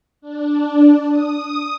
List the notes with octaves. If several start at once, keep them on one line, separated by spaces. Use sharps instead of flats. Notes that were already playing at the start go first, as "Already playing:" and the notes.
D4
D#6